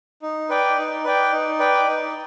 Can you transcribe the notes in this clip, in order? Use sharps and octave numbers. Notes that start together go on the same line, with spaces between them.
D#4
B4 D5 G5
D#4
B4 D5 G5
D#4
B4 D5 G5
D#4